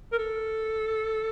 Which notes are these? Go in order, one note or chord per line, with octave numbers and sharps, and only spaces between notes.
A#4
A4